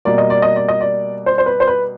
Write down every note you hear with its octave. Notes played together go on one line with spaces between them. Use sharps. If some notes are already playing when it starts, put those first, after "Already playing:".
B2 G3 A#3 D5
D#5
D5
D#5
D5
D#5
D5
C5
C5
B4
C5
B4